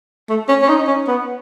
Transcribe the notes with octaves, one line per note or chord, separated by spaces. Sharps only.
A3
C#4
C#4
D#4
C#4
B3